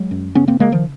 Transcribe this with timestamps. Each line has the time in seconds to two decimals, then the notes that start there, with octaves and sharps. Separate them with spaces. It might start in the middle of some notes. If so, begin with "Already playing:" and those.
Already playing: F#3 G#3
0.11 F#2
0.35 C#3 B3 C#4
0.48 A#3 C4
0.59 C#3 G#3 A#3
0.72 D#3 F3